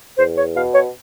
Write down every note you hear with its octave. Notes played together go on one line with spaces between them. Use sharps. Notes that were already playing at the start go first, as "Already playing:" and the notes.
E2 C5
C#5
B2 F5
C#5